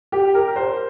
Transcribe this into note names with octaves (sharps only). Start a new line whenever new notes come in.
G4
A#4
C5